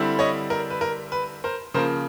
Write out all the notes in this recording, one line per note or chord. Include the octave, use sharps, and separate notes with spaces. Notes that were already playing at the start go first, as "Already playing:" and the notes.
Already playing: D3 G3 C4 E4
C#5 D#5
A#4
B4
A#4
B4
A#4 C5
C#3 F3 A#3 A#4 C5